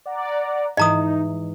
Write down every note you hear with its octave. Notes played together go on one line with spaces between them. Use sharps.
D5 F#5 A#5
G#2 E3 D#4 D#5 A#5 D#6